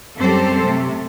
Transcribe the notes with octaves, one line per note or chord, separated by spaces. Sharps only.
F#2 G3 C4 G4 A4 C5
C3 A3